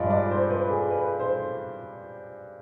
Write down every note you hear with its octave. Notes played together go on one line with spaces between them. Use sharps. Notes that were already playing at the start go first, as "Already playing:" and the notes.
Already playing: G2 F3 G#3 D5
D5
C5
B4
G#4
B4
C5